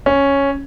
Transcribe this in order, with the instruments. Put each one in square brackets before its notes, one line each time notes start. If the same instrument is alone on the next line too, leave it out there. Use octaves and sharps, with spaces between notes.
[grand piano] C#4